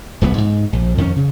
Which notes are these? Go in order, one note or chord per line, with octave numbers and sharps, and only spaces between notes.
D#1 C2 C3 B3
G#2
A#1
F2 D#3 B3 C#4
C#3